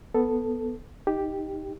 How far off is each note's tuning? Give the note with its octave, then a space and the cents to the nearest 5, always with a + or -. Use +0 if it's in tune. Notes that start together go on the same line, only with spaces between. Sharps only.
B3 +0 A4 +0
D#4 +0 G4 +0